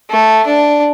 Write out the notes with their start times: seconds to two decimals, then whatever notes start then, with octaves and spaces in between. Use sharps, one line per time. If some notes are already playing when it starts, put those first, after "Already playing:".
0.11 A3
0.46 D4